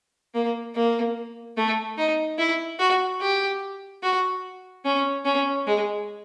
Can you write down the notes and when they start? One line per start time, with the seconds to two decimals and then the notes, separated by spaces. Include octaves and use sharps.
0.34 A#3
0.75 A#3
1.57 A3
1.98 D#4
2.38 E4
2.79 F#4
3.21 G4
4.03 F#4
4.85 C#4
5.25 C#4
5.67 G#3